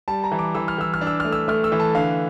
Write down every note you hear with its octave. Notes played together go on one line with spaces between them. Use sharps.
G3 A5
A#5
E3
D6
E3 E6
F6
E3 E6
F6
D4
E6
A3 F6
E6
A3 F6
E6
E3
A5
D3 F5